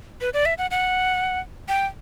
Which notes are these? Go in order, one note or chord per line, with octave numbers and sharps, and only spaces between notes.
B4
D5
E5
F#5
F#5
G5